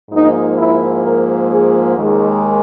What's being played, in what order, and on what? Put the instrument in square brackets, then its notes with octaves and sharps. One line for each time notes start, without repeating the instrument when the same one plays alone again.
[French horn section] G#2 F3 A#3 D#4
E4
A#4
G#4
D#2 D#3 G#3